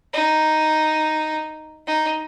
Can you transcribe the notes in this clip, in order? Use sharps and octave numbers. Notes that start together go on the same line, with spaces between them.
D#4
D#4